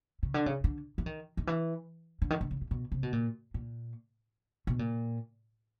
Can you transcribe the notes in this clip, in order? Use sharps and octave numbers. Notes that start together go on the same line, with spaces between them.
C#3
D3
C#3
D3
E3
D#3
D#3
E3
D3
D#3
D3
C#3
C3
B2
C3
B2
A#2
A#2
B2
A#2